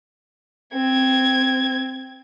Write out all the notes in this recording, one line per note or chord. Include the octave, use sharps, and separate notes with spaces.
C4 G#6